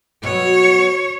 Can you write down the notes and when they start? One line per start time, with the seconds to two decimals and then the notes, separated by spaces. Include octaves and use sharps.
0.23 B2 F#3 C#5